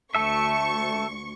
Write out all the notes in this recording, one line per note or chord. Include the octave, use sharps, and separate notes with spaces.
D2 A3 A4 E5 C#6